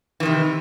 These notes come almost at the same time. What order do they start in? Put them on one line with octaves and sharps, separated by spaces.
E3 D#3 C3